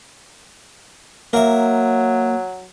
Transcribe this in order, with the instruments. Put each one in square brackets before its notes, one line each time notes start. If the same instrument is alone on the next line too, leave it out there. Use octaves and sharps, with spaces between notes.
[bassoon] F#3 [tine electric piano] A#3 [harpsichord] A#4 E5